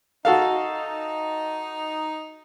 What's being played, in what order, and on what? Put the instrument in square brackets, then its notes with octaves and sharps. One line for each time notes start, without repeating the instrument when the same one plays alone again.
[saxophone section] D#4 [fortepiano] F#4 A4 F5